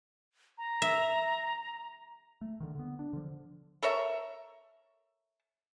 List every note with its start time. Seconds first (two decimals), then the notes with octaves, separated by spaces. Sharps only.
0.58 A#5
0.82 E5
2.41 A3
2.60 D3 D#3
2.75 D3 B3
2.99 D4
3.13 D3 F3
3.82 A4 A#4 C#5 E5